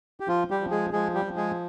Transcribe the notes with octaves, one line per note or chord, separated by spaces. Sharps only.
G4
F3 F4
G3 G4
F3
G#3 G#4
F3 G#3 G#4
G3 G4
F3
G#3 G#4